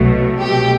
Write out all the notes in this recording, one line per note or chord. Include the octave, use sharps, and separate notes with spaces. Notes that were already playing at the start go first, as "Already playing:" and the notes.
Already playing: C2 B2 F#3 A3
G4